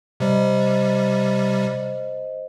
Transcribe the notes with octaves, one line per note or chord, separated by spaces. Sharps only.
C3 G3 C5 D#5